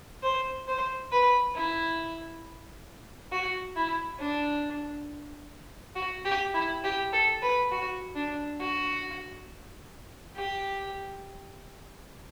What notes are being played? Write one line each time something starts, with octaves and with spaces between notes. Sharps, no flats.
C5
C5
B4
E4
F#4
E4
D4
F#4
G4
E4
G4
A4
B4
F#4
D4
F#4
G4